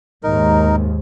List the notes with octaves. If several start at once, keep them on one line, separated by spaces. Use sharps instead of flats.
D#2 G#2 D#4 A#4